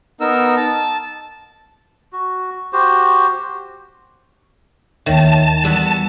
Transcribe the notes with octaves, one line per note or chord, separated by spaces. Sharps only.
B3 D#4 A#4 E6
A5
F#4
F#4 G4 C5
D#2 D#3 C#5 E5 A5
E2 G3 E5 F#5